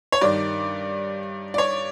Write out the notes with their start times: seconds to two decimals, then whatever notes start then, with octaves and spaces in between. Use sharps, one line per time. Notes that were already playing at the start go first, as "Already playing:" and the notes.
0.12 C#5
0.21 G2 D#3 D5
1.54 D5
1.58 C#5